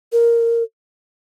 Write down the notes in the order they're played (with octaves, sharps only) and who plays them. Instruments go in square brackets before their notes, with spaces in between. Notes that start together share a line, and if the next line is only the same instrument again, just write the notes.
[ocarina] A#4